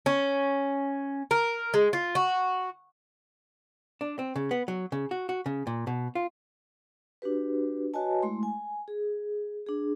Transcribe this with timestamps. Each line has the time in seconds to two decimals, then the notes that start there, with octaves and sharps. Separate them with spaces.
0.06 C#4
1.31 A#4
1.74 G#3
1.93 F4
2.15 F#4
4.01 D4
4.19 C4
4.36 C#3
4.51 B3
4.68 F#3
4.92 C#3
5.11 F#4
5.29 F#4
5.46 C#3
5.67 A#2
5.87 B2
6.15 F4
7.22 D4 F#4 G4 B4
7.94 F#4 B4 C#5 D#5 G#5 A5
8.22 G#3 A3 E4 C6
8.43 G#5
8.88 G#4
9.66 D4 G#4